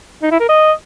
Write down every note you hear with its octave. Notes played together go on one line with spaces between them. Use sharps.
D#4
E4
A#4
D#5